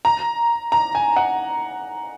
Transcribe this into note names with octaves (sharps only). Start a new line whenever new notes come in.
A#5
A#5
G#5
F#5